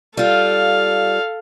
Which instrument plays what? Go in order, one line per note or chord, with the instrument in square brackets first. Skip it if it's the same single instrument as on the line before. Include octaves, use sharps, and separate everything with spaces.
[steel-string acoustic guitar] G3 F4 [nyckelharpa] A4 F5